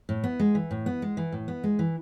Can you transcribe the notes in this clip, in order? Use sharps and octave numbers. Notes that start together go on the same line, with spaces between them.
A2
B3
G#3
E3
A2
B3
G#3
E3
A2
B3
G#3
E3